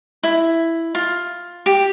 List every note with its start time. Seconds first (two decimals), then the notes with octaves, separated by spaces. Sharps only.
0.23 E4
0.95 F4
1.66 G4